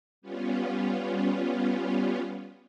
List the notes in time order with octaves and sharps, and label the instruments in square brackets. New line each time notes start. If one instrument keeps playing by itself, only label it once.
[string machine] G3 B3 C#4 F4